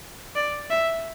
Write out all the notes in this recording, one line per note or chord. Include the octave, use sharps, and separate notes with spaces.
D5
E5